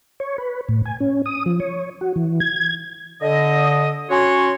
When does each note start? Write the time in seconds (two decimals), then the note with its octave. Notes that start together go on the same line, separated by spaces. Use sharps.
0.20 C#5
0.38 B4
0.69 A2
0.85 G#5
1.00 C#4
1.26 D#6
1.46 F3
1.60 C#5
2.01 F#4
2.16 E3
2.40 G#6
3.22 D3 D#5
4.11 C#4 F#4 C#5 C6